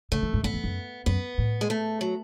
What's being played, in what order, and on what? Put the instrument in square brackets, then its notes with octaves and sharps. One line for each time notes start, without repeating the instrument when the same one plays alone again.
[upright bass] C#3 [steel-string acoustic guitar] A3
[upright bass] E3
G#2
[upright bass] F#2 [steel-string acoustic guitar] B3
[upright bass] E2
F#2
[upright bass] F#2 [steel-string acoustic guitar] B3
[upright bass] A2
[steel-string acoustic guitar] G#3
A3
F#3